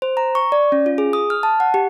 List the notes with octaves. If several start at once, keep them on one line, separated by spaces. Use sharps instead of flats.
C5
A#5
C#6
D5
C#4
F4
G#4
D#6
F6
A5
F#5
G4